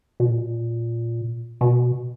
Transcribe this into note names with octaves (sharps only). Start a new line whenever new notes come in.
B2
A#2
B2